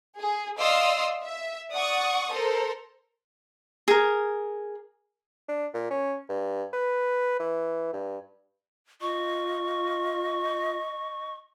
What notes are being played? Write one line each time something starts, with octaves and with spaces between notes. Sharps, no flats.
G#4
D5 D#5 F5 C6 D#6 E6
E5
D5 F#5 C#6 D#6
A4 A#4 C5
G#4 A#4
D4
A#2
C#4
G2
B4
E3
G2
F4 D#5 C#6